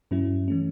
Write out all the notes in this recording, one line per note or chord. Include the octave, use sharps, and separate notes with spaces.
G2 F#3 C#4 E4
E3 A3 C#4